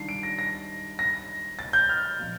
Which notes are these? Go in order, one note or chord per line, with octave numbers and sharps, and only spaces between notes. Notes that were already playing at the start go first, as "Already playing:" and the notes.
Already playing: D#3 G3 D4 F4 C7
D7
A#6
A#6
A#6
A6
G6
F6
A#2 F3